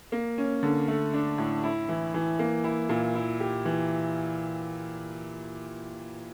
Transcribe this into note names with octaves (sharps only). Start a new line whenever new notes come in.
A#3
C#4
D3
A3
D4
A2
E4
E3
E3
A#3
E4
A#2
E4
G4
E3